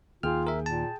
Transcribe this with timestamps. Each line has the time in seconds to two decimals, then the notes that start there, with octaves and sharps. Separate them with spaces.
0.23 D#2 F4 G#4 G5 F6
0.47 A#4 E5
0.66 A#2 A5